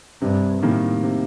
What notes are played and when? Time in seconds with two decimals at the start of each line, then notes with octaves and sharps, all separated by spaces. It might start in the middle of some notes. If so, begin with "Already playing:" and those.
0.21 G2 C3
0.62 A2 D#3 G3 A#3
1.03 C3